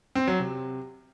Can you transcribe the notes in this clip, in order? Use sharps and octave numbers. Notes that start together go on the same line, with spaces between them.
C4
F#3
C3